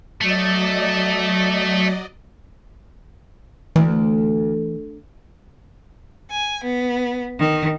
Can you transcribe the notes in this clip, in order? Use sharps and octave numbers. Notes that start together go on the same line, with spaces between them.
F#3 A3 D5 D#5
D2 E3
G#5
B3
D#3